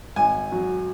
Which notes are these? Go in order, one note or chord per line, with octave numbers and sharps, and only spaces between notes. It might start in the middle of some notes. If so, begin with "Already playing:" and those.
G#1 G#5
F#3